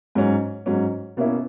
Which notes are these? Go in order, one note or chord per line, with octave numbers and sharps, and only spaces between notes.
G#2 F#3 C#4
G#2 F#3 C#4
B2 A#3 C#4 E4